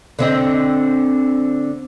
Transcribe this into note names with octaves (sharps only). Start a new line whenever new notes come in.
D3 C4 D#5